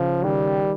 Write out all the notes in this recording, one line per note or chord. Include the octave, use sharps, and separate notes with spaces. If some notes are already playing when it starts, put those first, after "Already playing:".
Already playing: C#3 F3
D#3 G3